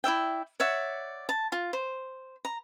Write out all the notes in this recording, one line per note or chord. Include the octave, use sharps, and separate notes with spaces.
E4 D5 E5 G5
C#5 D5 E5 F#5
A5
F4
C5
A#5